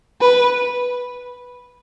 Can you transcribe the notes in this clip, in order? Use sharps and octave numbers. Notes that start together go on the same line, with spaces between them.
B4